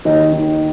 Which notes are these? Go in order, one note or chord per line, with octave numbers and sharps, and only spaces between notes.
D#2 D#5
D#3